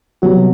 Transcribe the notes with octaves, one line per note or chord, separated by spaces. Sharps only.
C3 F#3 G3 B3 F#4